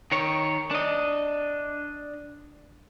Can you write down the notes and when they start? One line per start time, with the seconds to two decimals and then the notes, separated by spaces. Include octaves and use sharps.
0.12 D#3 C#5
0.71 D4 D#5